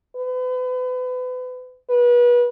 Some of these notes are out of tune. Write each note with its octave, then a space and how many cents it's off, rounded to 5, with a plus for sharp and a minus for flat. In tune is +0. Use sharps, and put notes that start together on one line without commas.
B4 +35
B4 -30